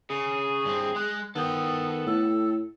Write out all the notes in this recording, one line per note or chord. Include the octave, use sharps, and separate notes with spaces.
C#3 G#4 D#7
G2 C4
G#3 F#6
D#3 B3 A4 G5 D#6
A2 E6